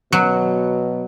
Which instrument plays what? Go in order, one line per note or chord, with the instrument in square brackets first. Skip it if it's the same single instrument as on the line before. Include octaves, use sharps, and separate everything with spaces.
[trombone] B2 [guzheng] F#3